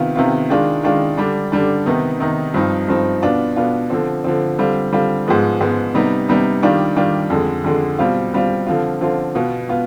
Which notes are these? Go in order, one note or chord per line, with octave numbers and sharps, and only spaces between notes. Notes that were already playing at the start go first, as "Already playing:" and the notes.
Already playing: C3 D#3 B3 F4
C3 D#3 B3 F4
D#3 G#3 D4 F4
D#3 G#3 D4 F4
D3 G3 D4
D3 G3 D4
C3 D#3 B3 D#4
C3 D#3 B3 D#4
G2 F3 C4 D#4
G2 F3 C4 D#4
B2 B3 D4 F4
B2 B3 D4 F4
D3 F3 C4
D3 F3 C4
D3 G3 C4 F4
D3 G3 C4 F4
G#2 F3 G#3 B3
G#2 F3 G#3 B3
C3 G3 B3 D#4
C3 G3 B3 D#4
D#3 G3 D4 F4
D#3 G3 D4 F4
F2 D3 G#3
F2 D3 G#3
B2 G3 C4 F4
B2 G3 C4 F4
D3 F3 C4 F4
D3 F3 C4 F4
B2 B3 F4
B2 B3 F4